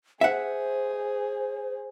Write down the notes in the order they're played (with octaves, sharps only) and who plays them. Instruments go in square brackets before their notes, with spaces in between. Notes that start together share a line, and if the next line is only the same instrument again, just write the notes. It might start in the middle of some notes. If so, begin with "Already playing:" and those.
[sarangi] G#4 [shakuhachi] C5 [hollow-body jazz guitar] E5 F#5